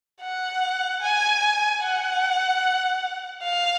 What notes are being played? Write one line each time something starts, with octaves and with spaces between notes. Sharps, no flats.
F#5
G#5
F#5
F5